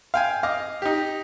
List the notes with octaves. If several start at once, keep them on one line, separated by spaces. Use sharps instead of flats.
F5 G5 G#5
D#5 F5 D6
D#4 G4